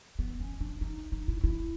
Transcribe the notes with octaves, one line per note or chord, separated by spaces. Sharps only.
B3
C#4
D4
D#4
D#4
E4
E4